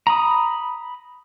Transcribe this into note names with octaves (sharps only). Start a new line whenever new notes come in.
A#5 B5 D#6